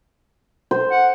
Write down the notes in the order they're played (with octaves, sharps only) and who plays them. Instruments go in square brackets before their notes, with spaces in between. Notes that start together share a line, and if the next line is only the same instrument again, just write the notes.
[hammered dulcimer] C5
[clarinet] F#5